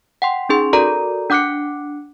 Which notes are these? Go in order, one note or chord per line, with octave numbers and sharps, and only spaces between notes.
F#5 G5 C6
C#4 D#4 G#4 C6
F#4 A4 A#4 D5 A#5
D4 F#5 D6 F#6 C7 C#7